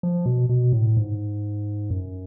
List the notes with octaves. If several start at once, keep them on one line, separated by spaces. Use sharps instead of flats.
F3
B2
B2
A2
G#2
F#2